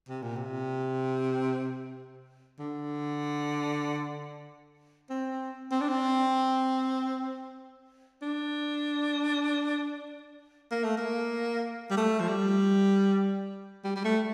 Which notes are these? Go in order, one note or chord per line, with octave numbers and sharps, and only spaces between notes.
C3
A#2
C3
D3
C4
C4
D4
C4
D4
A#3
A3
A#3
G3
A3
F3
G3
G3
G3
A3